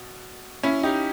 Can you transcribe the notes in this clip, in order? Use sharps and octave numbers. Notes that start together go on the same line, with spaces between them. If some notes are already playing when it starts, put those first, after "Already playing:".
Already playing: B2
C#4 E4
D#4 G4